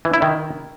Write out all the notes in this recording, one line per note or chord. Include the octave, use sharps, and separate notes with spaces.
E3
E4
D#3